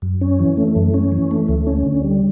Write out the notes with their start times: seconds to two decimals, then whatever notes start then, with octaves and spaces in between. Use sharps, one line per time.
0.02 F#2
0.21 C#4
0.40 E3
0.57 A3
0.76 F#2
0.94 C#4
1.12 E3
1.31 A3
1.48 D2
1.67 C#4
1.86 D3
2.04 G3